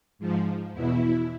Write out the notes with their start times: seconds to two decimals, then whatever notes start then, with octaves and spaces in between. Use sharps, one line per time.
0.19 G#2 F3
0.73 E2 B2 E4